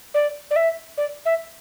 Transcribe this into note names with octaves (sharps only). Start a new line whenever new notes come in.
D5
D5
E5
D5
E5